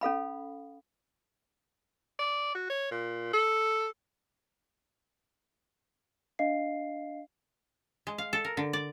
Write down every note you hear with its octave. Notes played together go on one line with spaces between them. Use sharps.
C#4 A4 F5 B5
D5
F#4
C#5
A#2
A4
D4 D#5 F5 C7
G#3
F5
A4
A#4
D3
D5